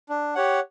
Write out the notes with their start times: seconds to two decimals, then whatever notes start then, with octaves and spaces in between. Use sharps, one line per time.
0.09 D4
0.35 G4 C#5 F#5